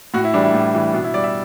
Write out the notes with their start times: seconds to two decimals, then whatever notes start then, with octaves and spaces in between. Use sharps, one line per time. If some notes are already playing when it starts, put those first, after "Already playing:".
0.14 A2 F#4
0.24 E4
0.34 E3 G3 D4
0.44 E4
0.54 A2
0.74 E3 G3
0.94 B2 D4
1.04 E4
1.14 G3 D5
1.24 E5